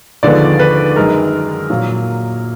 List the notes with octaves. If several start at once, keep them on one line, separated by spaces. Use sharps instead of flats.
D#2 D3 F3 G#3 B3 D5
B4
F#2 D#3 G#3 A#4
A#2 F#3 A#3